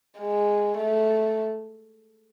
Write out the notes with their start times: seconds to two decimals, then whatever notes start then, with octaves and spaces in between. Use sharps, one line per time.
0.19 G#3
0.78 A3